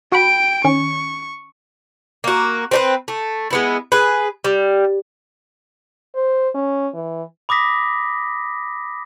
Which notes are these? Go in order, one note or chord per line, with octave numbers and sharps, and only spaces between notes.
F#4 G5 B5 D7
D#3 C#4 C#6
A#3 F#4
C4 D4 B4
A3
G#3 B3 E4
G#4 B4
G3
C5
C#4
E3
B5 D6 D#6 A#6 B6